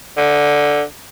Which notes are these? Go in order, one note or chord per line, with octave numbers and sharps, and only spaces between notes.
D3